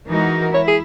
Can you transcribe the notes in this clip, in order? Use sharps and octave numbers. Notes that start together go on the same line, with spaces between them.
E3 G#3 D#4 F#4 A#4
E4 C#5
G#4